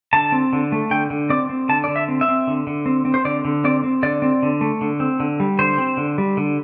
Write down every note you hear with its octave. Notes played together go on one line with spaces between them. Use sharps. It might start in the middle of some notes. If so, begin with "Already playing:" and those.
D3 A5
C4
D3
A3
D3 G5
D3
C4 D5
C4
D3 A5
D3 D5
E5
C4
E5
C4
D3
D3
C4
C4
C5
D3 D5
D3
C4 D5
C4
D3 D5
C4
D3
A3
D3
C4
D3
G3
D3 C5
C4
D3
G3
D3